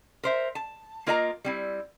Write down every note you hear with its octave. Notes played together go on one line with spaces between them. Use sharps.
A#4 C5 E5
A5
A#3 F4 A#4 D#5 E5 A#5
G3 C4 E4